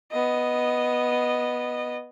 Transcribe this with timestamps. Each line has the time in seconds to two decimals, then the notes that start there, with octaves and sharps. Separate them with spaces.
0.12 B3 D#5